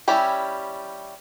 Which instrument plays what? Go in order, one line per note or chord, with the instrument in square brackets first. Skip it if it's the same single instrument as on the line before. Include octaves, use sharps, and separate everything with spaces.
[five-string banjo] G3 C#4 E4 G4